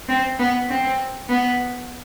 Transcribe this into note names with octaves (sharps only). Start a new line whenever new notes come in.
C4
B3
C4
B3